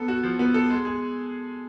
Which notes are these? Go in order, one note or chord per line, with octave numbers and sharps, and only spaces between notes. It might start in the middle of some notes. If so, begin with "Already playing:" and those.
Already playing: B3 A4
F#4
F3
B3
A4
G#3
G#4